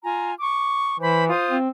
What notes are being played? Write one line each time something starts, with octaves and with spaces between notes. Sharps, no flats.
F4 G#5 A#5
C#6 D6
E3 C5 B5
F4 C5 D#6
C4